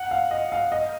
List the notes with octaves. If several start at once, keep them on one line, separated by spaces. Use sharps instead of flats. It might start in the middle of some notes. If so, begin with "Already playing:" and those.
Already playing: F#5
F5
D#5
F5
D#5